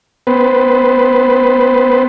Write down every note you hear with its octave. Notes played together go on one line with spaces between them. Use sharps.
B3 B4 C5